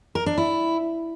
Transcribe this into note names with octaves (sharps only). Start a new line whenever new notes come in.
A#4
D4
E4